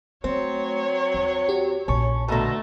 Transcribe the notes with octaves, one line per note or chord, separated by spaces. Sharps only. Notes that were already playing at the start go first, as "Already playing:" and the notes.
F#3 A3 C4 C#5
D#2
F#4 G4
A#1 A#2 C#4 A5 C#6
B2 D3 A3 A5 A#5 A#6